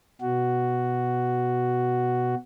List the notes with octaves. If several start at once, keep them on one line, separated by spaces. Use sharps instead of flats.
B2 F#4